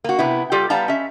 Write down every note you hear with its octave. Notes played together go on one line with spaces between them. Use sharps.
A#3 F#4
C3 B3 E4
G3 F4 G4 A4
G3 B3 F5 A5 A#5
C#4 E5